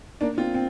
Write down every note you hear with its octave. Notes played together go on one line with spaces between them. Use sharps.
A#3 D4
C4 F4
C4